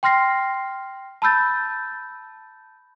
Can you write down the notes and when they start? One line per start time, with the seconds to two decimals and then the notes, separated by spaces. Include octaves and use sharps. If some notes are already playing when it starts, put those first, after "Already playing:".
0.03 G5 C6 F6 A#6 C7
1.22 A5 B5 E6 G6 A6